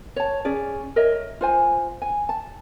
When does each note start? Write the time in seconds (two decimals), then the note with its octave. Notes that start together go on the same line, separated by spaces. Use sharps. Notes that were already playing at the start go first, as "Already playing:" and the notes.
0.16 C#5 A5
0.45 C#4 G#4 D5
0.96 A#4 C#5 D#5 E5
1.41 F4 C5 G#5
2.02 G#5
2.29 A5